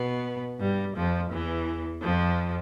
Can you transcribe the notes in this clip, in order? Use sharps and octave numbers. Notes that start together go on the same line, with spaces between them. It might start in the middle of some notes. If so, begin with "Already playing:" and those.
Already playing: B2 B3
G2 G3
F2 F3
E2 E3
F2 F3